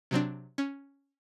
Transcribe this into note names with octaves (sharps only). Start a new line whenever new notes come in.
C3 F#3 C4 D4
C#4